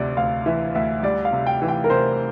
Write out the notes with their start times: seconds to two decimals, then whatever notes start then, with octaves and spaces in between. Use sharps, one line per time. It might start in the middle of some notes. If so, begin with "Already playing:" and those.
Already playing: D2 C3 D5
0.17 D2 F5
0.46 E3 E5
0.75 D2 E5
1.03 G3 D5
1.25 F5
1.32 C3
1.47 G5
1.62 E3
1.68 G5
1.84 A#4
1.90 C3 C5